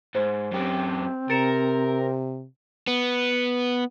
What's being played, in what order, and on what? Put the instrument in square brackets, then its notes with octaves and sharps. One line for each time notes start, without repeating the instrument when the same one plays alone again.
[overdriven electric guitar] G#2 [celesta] C5
[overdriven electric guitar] F#2 G4 [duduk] C4
[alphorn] C3 [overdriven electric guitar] A#4 [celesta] A6 C#7 E7
[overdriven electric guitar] B3